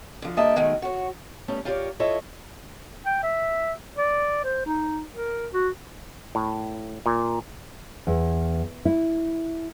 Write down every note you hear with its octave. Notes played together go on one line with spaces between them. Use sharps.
D3 F3
D3 G3 A#3 D#5 E5 A5
B2 D#3 G#3 A3 D#4
F#4 C#5
G3 A3 B3 C#4
F4 G4 A#4 B4 C#5 D5
E4 F4 A4 C#5 D#5 E5
G5
E5
D5
C5
D#4
A#4
F#4
A2
A#2
E2
E4